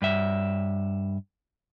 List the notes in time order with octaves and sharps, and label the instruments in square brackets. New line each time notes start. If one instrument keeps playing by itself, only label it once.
[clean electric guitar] G2 E5